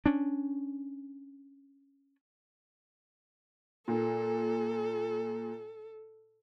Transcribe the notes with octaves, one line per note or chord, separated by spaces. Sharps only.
C#4 D4
A#2 A4